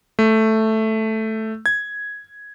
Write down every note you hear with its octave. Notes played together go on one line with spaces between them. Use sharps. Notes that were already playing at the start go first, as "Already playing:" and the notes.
A3
G#6